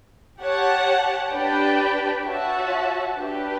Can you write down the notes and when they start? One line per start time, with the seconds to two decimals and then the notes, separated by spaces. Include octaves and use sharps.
0.41 G4 C#5 F#5 A5
1.33 D4 G4 B4 D5 G5
2.25 F#4 C#5 E5 A5
3.18 D4 G4 B4